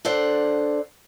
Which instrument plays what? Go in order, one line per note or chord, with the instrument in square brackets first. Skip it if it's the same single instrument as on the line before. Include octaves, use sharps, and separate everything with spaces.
[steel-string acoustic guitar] D4 A4 C5 D5 F#5